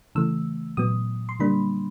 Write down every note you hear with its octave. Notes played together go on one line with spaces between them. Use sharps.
C#3 E3 A3 E6
A#2 F#3 B3 D#6
C6
D3 G3 A#3 D4 B5